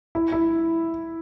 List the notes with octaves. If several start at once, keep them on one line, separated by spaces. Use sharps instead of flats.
E4
E4